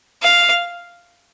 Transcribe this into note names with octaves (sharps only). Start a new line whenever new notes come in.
F5